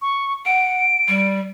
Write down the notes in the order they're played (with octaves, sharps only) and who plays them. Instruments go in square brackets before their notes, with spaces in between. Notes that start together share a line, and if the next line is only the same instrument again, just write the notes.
[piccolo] C#6
[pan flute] F#5 [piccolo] D7
[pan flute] G3